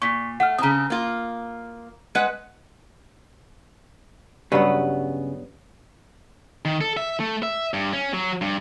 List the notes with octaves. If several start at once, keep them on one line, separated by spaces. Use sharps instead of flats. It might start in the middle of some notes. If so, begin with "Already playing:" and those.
A#2 C#6 B6
A3 F#5 F6
C#3 C4 A#5 D#6
A#3 F4
G#3 B4 F#5
G2 C#3 F#3 B3 B4
D#3
A4
E5
A3
E5
G2
C#4
F#3
G2